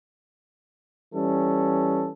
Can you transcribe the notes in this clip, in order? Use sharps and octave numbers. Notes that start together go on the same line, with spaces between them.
E3 G3 C#4 A4